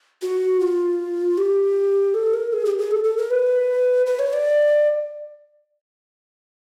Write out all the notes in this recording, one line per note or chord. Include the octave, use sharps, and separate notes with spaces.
F#4
F4
G4
A4
A#4
G#4
G4
G#4
A4
A4
A#4
B4
B4
C#5
D5